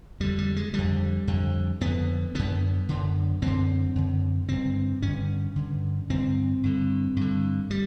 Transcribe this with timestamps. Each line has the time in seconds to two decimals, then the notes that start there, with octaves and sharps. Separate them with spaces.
0.20 F2 D3 G3
0.38 G3
0.56 G#3
0.74 F2 D3 G3
1.27 F2 D3
1.81 F2 D3 B3
2.35 F#2 D3 B3
2.89 F#2 D3
3.42 F#2 D3 C4
3.95 F#2 D3
4.49 G2 D3 C4
5.02 G2 D3 C#4
5.56 G2 D3
6.10 G2 D3 C4
6.63 G2 D3
7.16 G2 D3
7.71 G3